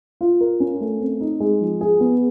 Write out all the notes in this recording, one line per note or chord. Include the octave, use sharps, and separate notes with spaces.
F4
A#4
C#4
A3
C4
D#4
G#3
F3
G#4
B3